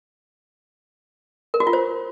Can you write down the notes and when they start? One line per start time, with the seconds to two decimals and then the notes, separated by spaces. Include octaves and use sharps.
1.54 A#4
1.60 F#4
1.67 F4
1.73 C5